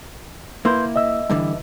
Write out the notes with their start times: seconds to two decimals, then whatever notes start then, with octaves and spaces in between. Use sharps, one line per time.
0.65 A#3 E4 B4 C6 G6
0.96 D#5 E5 E6
1.30 G2 D3 E3